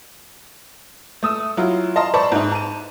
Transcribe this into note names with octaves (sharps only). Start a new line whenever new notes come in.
A3 D#6 E6
F#3 E4 F4
D#5 F5 A5 A#5 C6
C5 D5 E5 A5 B5 C#6
G#2 D#4
A5 D#7